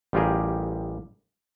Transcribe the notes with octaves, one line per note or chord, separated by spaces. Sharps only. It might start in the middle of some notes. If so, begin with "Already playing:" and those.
A1 G3 F4 G4 G#4 A#4